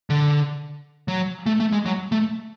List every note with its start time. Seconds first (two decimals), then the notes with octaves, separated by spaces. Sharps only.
0.10 D3
1.08 F#3
1.46 A3
1.60 A3
1.72 G#3
1.86 F#3
2.12 A3